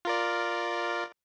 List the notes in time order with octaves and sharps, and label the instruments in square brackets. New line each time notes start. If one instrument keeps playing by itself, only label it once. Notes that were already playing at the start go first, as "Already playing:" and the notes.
[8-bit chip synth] F4 A#4 D5